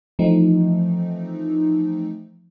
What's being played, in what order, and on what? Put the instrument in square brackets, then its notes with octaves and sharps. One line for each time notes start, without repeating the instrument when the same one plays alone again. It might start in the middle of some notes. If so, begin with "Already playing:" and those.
[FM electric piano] E3 F3 A3 C4 D#4